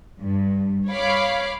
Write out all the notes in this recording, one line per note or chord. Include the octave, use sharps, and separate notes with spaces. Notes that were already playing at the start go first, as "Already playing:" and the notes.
G2
C#5 F5 B5 D6